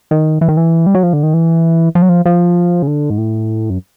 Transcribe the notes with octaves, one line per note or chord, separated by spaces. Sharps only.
D#3
E3
D#3
E3
G3
F#3
F3
D3
D#3
E3
F3
F#3
F3
F3
C#3
D3
G#2
A2
F#2